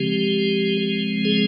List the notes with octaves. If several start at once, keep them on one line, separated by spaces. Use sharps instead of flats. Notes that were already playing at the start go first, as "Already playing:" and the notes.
Already playing: C#3 F3 G#3 C4 G4
G#4